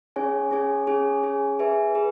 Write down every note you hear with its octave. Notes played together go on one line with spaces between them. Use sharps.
C#4 G#4 C#5 G#5
C#4 G#4 C#5 G#5
C#4 G#4 C#5 G#5
C#4 G#4 C#5 G#5
G#4 B4 E5 G#5
G#4 B4